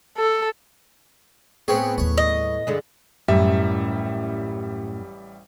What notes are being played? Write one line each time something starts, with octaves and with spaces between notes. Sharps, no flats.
A4
A2 B3 C4 G#4 C#5
D#2 G3 C#5
D#5
G2 D3 G#3
A1 F#2 A2 G3 E5